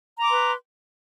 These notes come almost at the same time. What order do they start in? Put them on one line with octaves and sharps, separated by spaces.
A#5 D6 C6 B4